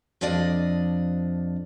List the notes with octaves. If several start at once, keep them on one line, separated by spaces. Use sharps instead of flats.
F2 F3 D4 D5 D#5